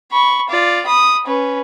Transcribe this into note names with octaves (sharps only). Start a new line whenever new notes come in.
B5 C#6
F4 D5
B5 D#6
C#4 B4